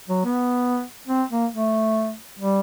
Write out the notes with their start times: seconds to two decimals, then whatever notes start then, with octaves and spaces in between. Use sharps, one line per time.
0.09 F#3
0.25 B3
1.08 C4
1.31 A#3
1.53 A3
2.40 G3